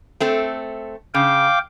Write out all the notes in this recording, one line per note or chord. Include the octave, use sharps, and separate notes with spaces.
A3 C4 A4
C#3 F5 G5 D6